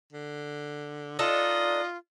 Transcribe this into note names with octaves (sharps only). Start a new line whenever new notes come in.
D3
D4 D#4 F4 A4 D#5